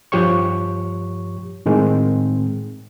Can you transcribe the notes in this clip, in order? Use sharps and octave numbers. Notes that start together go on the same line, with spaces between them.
G2 F3 G4 C#5 C#6
A2 D#3 G#3 C4